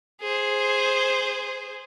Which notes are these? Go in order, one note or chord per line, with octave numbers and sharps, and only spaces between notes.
G#4 C5